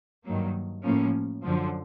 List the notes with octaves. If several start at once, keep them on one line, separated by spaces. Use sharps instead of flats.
G2 D#3 F#3 A#3
A2 F3 A#3 C#4
F#2 D3 F3